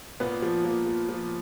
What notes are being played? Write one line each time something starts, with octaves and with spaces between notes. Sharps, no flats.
A#2 B3
F3
F3 A#3
F3
F3